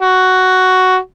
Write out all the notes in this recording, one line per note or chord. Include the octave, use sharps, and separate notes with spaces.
F#4